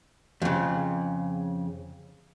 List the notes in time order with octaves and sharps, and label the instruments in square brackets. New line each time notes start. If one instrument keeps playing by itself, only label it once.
[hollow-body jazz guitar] F2 C#3